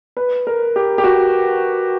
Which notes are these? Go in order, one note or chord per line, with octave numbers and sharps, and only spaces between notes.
B4
A#4
G4
G4
F#4